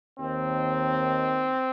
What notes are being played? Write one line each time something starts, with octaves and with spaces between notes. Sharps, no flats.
D#2 D#3 C4